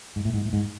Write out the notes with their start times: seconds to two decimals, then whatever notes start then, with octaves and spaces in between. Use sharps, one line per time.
0.16 G#2
0.25 A2
0.34 G#2
0.45 A2
0.53 G#2